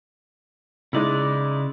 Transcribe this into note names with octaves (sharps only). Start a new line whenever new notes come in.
C#3 G#3 D#4 E4 D5 F#6